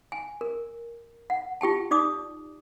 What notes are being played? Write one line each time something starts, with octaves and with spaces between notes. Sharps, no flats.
G#5
A#4
F#5
F4 G4 G5 A5
D#4 D5 D6 D#6